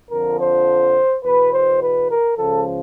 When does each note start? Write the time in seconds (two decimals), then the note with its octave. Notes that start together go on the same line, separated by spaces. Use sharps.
0.11 F2 D3 F3 A#4
0.40 C5
1.24 E2 B2 B4
1.53 C5
1.81 B4
2.10 A#4
2.37 C#2 C#3 F3 A4